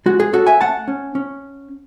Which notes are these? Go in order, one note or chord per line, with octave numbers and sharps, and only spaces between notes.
G#3 F#4
G#4
C#4 F#4 A4
E5 G#5
A3 F#5 A5
C#4
C#4